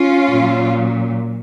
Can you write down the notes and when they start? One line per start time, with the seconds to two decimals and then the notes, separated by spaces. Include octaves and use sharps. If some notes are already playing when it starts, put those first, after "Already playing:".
Already playing: C#4 F4
0.27 A#2 F#3